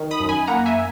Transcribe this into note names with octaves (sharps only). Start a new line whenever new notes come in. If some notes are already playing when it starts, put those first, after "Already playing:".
Already playing: D#3
B5 D#6
F#2
G#5 B5
A#3 F#5 A#5
E5 G#5